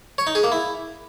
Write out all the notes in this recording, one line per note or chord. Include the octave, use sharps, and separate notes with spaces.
C#5
D#4
G#4
A#3
E4